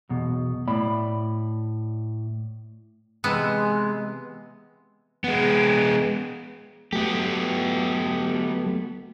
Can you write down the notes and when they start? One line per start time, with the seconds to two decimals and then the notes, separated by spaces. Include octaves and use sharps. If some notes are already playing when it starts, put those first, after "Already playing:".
0.10 B1 E2 B2
0.67 A2 A3 D5 B5
3.24 C3 E3 G#3 B3
5.24 G#3 B3
6.93 F#3 A3 B3 G4